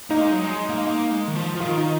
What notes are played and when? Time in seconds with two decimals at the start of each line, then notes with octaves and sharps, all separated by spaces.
0.10 A#3 D#4
0.21 G#3
0.32 F#3
0.44 G#3
0.69 A#3
0.78 G#3
0.86 A#3
1.11 G#3
1.28 D#3
1.35 F3
1.56 F3
1.60 D#3 F4
1.78 D#4